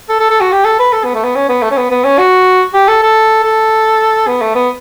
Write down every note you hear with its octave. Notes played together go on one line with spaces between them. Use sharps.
A4
A4
A4
F#4
G4
A4
B4
A4
B3
A3
B3
C#4
B3
A3
C#4
B3
B3
C#4
F#4
G4
A4
A4
A4
B3
A3
B3